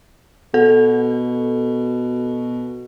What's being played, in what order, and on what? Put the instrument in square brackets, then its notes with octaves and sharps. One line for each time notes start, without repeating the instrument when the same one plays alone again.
[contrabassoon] B2 [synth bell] A4